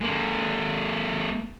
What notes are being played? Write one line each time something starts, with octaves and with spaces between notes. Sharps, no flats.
G#3 A#3